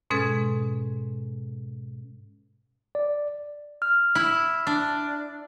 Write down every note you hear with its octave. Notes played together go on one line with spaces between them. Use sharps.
G#2 B2 G#3 C#4 A4 G#6
D5
F6
E4
D4